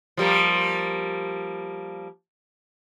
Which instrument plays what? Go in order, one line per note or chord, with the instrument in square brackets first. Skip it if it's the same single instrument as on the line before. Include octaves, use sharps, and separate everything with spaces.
[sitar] F3 G3 A#3